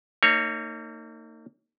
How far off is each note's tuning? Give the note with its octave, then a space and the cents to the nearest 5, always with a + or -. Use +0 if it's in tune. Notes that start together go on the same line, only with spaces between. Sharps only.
A#3 -40 D#4 +0 C#5 +0